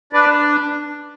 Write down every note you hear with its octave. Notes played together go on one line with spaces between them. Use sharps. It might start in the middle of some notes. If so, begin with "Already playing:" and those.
D4 B4 D5